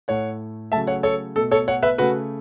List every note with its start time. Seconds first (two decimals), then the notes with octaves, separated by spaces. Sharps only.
0.08 A2 A3 C#5 F#5
0.72 C#3 F#3 A3 E5 A5
0.87 C#5 F#5
1.03 A4 C#5
1.36 B2 A3 A4
1.51 A4 C#5
1.68 C#5 F#5
1.83 B4 E5
1.98 C#3 A3 F#4 B4